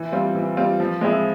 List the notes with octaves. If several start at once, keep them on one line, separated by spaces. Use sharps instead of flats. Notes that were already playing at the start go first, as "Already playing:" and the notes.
Already playing: E3
G3 C4 F4
E3
G3 C4 F4
F3
G#3 C4 E4 G#4